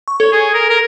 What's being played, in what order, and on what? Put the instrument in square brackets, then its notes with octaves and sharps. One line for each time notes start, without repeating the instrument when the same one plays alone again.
[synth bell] C#6
[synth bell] A4 [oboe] C#5
[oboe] G#4
A#4
A#4